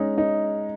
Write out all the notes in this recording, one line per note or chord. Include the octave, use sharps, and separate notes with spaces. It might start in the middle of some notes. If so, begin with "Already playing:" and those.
Already playing: G#3 C#4 D#4
D#4